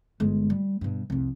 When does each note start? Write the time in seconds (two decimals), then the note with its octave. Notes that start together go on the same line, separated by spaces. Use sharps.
0.20 G1 G#3
0.50 G3
0.81 G2 B2
1.10 C2 F2